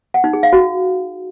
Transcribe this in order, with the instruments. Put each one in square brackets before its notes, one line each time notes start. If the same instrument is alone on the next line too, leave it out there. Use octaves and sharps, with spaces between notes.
[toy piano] F#5
D#4
G#4
F5
F#4